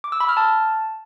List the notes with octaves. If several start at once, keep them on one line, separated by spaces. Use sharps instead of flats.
D6
E6
B5
F6
A5